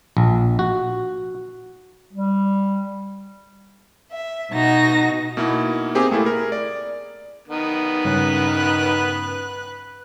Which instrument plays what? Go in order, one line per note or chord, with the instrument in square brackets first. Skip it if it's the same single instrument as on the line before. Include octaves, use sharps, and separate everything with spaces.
[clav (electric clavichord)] A#1
F#4
[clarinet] G3
[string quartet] E5
B2 D#4 F#4 A#6
[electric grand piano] B2 A#3 D#4 E4
A#3 C4 G4 G#4
A3 A#3 E4 G#4 A4
G#4 A#4
D5
[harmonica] D#3 B3
[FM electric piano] G2 C#3 C#4 [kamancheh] B4 F#6